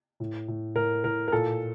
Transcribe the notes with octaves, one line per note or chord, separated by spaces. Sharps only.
A2
A2
A2 A#4
A2 A#4
A#4
A#2 A4